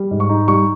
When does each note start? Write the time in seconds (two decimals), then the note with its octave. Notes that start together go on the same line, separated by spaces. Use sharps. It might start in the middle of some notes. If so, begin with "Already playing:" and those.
Already playing: G3
0.11 G#2
0.20 C#6
0.29 D#4
0.48 G3 C#6